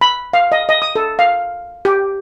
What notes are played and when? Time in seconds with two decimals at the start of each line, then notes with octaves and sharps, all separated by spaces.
0.01 B5
0.33 F5
0.52 D#5
0.69 D#5
0.82 D#6
0.95 A4
1.19 F5
1.85 G4